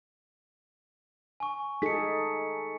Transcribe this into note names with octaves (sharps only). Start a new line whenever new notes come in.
G#5 C#6
D#4 G#4 A4 B6 C#7